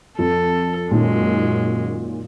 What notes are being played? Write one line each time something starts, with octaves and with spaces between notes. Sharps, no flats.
F2 F3 A4
F#2 A#2 D#3 G#3 C#4